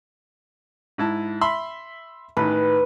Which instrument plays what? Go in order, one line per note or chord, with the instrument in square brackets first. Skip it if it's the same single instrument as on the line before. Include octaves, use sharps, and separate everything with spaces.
[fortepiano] G#2 E4 A5
E5 B5 C6
[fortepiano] A1 D#3 [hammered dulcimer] B4